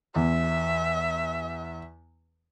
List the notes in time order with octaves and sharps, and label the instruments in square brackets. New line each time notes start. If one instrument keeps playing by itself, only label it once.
[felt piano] E2 [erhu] E5